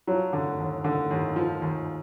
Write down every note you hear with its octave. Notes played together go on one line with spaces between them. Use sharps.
F3 F#3
D3
D#2
D3
D#2
F3
D#2